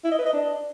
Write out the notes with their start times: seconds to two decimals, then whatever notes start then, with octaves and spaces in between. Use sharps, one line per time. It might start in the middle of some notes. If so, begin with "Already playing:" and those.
0.04 E4
0.11 D#5
0.19 B4
0.26 D#5
0.33 D4